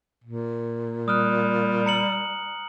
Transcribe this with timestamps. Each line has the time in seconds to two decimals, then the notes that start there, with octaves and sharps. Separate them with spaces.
0.24 A#2
1.08 G3 D#6 F6 F#6
1.86 A#5 C#7 F#7